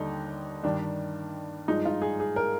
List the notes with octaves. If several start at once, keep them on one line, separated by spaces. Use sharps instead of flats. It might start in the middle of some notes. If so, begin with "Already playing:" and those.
Already playing: D#2 D3 G3 D#4
G2 D#3 G3 D4
G2 F3 G#3 D#4
F4
G#4
G#4
A#4